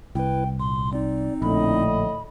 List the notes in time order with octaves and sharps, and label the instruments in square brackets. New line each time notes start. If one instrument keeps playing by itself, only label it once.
[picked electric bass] C2 [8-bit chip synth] E4 B4 [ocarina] G5
[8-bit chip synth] A#2 [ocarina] C6
[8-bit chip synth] C4 D#4 [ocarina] D5
[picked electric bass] A#1 [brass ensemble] A2 D3 D#5 [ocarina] B5